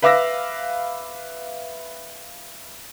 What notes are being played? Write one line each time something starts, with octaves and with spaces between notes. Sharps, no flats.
B4 E5 F5 D6 E6 A#6